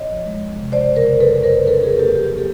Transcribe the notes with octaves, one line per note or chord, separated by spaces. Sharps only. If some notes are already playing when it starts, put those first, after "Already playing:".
Already playing: C#5 D#5
F3
G#3
D2
C3
C#3 C5 D5
C#3
A#4 C5
F2
F#3 A4 B4
F2
A#4 C5
C#3
D4 A4 B4
D4 G#4 A#4
A#3 G4 A4
F3 G4
A#3
G4 A4